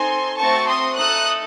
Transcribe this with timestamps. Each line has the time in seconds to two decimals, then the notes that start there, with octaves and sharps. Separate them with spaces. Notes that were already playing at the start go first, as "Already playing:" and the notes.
Already playing: C4 D#4 A4 G#5 C6
0.37 A3 C4 F#4 A5 C#6
0.67 C6 D#6
0.96 A3 D#4 A4 D#6 F#6